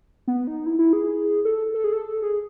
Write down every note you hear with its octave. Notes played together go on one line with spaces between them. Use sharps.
B3
D#4
E4
E4
G#4
A4
A4
G#4
A4
G#4